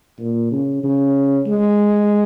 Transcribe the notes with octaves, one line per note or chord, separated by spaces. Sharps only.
A#2
C#3
C#3
G#3